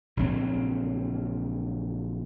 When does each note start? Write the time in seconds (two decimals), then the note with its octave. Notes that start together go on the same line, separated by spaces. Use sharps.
0.17 A#1 C#3 F#3 C4